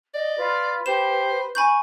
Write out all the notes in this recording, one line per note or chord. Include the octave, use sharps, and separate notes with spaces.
D5 D#5
F4 B4
G4 C5 E7
G#5 B5 C#6 G6